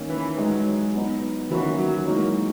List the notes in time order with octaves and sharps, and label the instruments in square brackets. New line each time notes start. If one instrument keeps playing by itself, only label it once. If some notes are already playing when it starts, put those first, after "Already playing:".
Already playing: [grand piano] D#3 A#3 C#4
[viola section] E3
[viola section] F#3 [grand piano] G#3 D#4 G#4
[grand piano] F#3 B3 D#4
[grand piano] D#3 F#3 A#3 C#4 F#4 [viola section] E3
[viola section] F#3
[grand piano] E3 G#3 D#4 F#4 [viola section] A#3